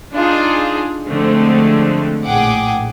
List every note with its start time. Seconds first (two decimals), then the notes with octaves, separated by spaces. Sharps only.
0.14 D4 D#4 F4 G#4
1.07 D3 F3 G#3 A3 C4
2.25 A#1 A2 G#4 F#5 G5 D6